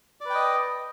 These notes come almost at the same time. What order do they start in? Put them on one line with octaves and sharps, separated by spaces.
D5 B4 G5 D#5